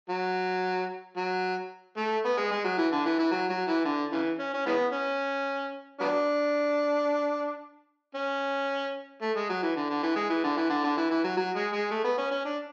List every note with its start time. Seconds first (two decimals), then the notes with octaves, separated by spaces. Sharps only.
0.09 F#3
1.17 F#3
1.97 A3
2.25 B3
2.38 G#3
2.52 G#3
2.64 F#3
2.78 E3
2.92 D3
3.05 E3
3.19 E3
3.31 F#3
3.50 F#3
3.68 E3
3.85 D3
4.12 C#3 E3
4.39 C#4
4.54 C#4
4.66 E3 G#3 B3
4.93 C#4
6.00 F#3 B3 D4
8.15 C#4
9.22 A3
9.36 G#3
9.49 F#3
9.63 E3
9.76 D3
9.90 D3
10.03 E3
10.16 G#3
10.30 E3
10.44 D3
10.57 E3
10.70 D3
10.84 D3
10.97 E3
11.11 E3
11.24 F#3
11.37 F#3
11.56 G#3
11.73 G#3
11.91 A3
12.04 B3
12.18 C#4
12.31 C#4
12.45 D4